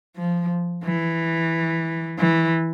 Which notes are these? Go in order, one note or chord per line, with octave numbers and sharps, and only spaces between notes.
F3
E3
E3